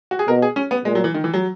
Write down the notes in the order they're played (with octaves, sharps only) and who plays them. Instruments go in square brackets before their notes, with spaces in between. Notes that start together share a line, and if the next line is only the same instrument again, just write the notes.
[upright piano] F#4
G#4
[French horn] B2 [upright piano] A#4
[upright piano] G#4
C#4
B3
[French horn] A#2 [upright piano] G#3
[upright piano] F#3
E3
D#3
E3
F#3